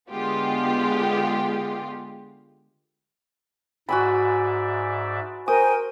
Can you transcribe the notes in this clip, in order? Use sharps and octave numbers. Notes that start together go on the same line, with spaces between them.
D3 G#3 B3 F4 G4
G#2 F#4 D5 E5 G#5 B5
A#4 C5 G5 G#5 D#6